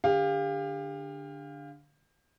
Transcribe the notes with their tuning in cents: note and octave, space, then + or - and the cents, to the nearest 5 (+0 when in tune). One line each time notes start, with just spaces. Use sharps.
D3 +0 G4 +35 F5 +5